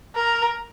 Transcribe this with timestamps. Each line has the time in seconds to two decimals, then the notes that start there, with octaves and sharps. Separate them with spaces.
0.15 A#4